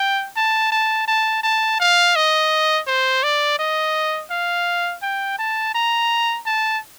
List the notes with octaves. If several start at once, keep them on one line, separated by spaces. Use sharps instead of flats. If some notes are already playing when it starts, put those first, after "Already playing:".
Already playing: G5
A5
A5
A5
A5
F5
D#5
C5
D5
D#5
F5
G5
A5
A#5
A5